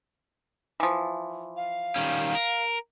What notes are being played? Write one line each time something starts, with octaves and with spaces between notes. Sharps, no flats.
E3 F3
F5
D#3 G3 C#4
A#4